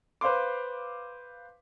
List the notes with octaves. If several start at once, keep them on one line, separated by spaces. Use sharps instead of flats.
B4 C5 F5 C6 D6